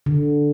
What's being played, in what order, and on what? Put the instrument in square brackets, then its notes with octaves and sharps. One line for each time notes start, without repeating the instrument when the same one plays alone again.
[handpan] D3